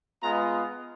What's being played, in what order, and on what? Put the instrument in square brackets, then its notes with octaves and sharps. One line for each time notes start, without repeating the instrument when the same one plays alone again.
[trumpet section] G#3 B3 F4 A#5